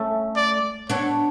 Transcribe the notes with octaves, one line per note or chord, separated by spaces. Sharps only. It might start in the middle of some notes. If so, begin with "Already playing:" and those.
Already playing: A3 C#4
D5
B3 D4 C#5